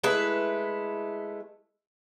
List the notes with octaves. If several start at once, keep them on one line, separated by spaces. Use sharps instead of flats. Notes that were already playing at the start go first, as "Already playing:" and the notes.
G#3 A3 E4 B4